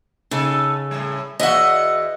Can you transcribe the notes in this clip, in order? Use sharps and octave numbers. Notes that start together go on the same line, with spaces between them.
C#3 D#4 G4 A4
A2 G3
E2 F#4 D#5 E5 F#5